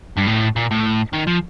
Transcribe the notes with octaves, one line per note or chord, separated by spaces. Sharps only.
G2
A2
A#2
A2
D#3
F3